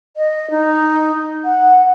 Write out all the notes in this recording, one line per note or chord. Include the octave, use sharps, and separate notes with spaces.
D#5
D#4
F#5